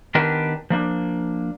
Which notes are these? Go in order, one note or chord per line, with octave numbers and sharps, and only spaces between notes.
D#3 B3 D4 G4 A#4 B4
F3 A#3 D4